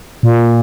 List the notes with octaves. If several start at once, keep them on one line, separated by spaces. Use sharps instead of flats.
A#2